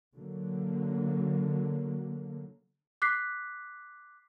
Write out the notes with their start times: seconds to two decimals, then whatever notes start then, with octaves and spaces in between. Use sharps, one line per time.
0.14 D3 F#3 A#3
3.02 D6 F#6 B6 C7